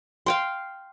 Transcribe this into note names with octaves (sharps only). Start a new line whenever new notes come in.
F5 G5 C6